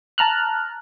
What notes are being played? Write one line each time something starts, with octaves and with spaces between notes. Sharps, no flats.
A5 A#5 F6 F#6